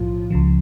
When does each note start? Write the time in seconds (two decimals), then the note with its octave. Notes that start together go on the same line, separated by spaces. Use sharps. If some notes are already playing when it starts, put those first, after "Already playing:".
Already playing: B1 A2 F3 F4
0.30 C#2 C#3 F3